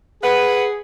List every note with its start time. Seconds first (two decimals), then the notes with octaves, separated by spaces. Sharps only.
0.22 G#4 B4 F#5